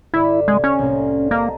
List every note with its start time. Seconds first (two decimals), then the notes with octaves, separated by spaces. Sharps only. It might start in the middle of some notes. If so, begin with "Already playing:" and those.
0.14 G1 E4 D5 E5
0.48 C2 G#3 G#6
0.64 C#4
0.79 C2 A2 A#3
1.31 A#3 D#5 A5 A#5